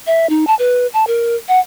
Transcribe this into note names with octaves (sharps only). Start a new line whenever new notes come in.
E5
D#4
A5
B4
A5
A#4
F#5